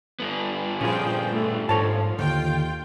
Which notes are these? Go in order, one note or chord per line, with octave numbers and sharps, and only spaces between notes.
G2 B3
A#2 F3 C#4 G#4 G5
A3
G#2 F3 A4 C#5 A5
D#2 D3 F4 G5